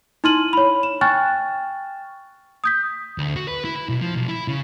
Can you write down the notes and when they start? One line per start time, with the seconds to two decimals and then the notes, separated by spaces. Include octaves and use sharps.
0.24 D#4 E4 C6 F6 D#7 F#7
0.53 C#5 B5
0.83 E7
1.01 G5 G#5 C#6 F6 F#6 A6
2.64 D#6 G6 B6
3.18 D2
3.36 F#4
3.48 B4
3.65 E4
3.76 E4
3.89 B1
4.01 F3
4.16 B1
4.29 E4
4.48 C#3